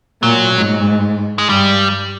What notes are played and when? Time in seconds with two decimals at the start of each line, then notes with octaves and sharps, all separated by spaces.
0.23 A#2 F#3
0.55 G#2
1.38 G#3
1.49 G2 G3